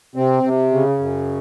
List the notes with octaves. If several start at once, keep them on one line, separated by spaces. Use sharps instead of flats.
C3 C4
C3
C#3
F#2